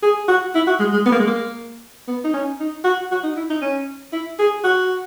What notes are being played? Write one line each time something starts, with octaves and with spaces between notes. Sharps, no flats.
G#4
F#4
E4
F#4
G#3
G#3
B3
A#3
G#3
A#3
B3
D#4
C#4
D#4
F#4
F#4
D#4
E4
D#4
C#4
E4
G#4
F#4